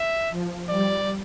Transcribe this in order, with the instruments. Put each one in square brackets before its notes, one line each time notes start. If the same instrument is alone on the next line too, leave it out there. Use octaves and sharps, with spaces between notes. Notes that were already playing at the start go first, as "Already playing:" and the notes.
Already playing: [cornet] E5
[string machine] F3
[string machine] G3 [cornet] D5